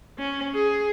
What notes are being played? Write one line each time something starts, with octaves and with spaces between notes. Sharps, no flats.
C#4
G#4